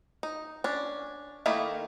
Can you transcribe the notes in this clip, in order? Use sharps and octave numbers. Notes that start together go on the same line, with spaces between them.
D#4
C#4 D4
D#3 A3 A#3 D#4 E4